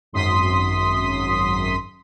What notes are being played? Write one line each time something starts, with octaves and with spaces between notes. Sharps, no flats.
G#1 F#2 C6 D#6 B6